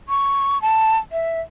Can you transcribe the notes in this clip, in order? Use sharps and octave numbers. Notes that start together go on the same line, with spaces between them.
C#6
A5
E5